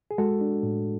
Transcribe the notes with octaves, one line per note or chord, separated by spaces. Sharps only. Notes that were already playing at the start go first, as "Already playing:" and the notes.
G#4
G#3 F#4 A4
D4
A2